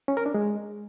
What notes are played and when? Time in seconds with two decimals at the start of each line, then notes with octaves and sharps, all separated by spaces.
0.08 C#4
0.17 A#4
0.26 D4
0.34 G#3